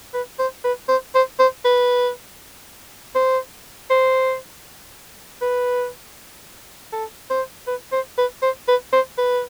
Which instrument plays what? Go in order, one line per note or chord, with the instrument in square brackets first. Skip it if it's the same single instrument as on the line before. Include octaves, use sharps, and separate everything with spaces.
[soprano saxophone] B4
C5
B4
C5
C5
C5
B4
C5
C5
B4
A4
C5
B4
C5
B4
C5
B4
C5
B4